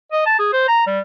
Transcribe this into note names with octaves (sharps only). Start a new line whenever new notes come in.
D#5
A5
G#4
C5
A#5
G3